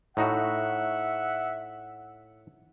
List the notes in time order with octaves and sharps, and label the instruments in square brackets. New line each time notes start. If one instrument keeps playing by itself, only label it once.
[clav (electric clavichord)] A2 D#4 F#4 [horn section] E5 F#5